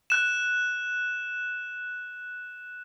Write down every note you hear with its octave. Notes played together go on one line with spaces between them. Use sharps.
F#6 E7